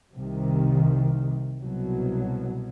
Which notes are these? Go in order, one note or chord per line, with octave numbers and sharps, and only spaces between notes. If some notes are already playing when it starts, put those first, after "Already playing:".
C2 C3 D#3
C2 B2 F#3